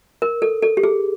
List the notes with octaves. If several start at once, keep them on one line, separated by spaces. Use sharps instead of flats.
A#4
A4
A4
G4
G#4